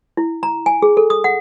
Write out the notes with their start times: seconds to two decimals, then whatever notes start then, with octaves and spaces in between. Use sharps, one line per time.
0.17 E4
0.43 A#5
0.66 G#5
0.82 G#4
0.97 A4
1.10 D#6
1.24 F#5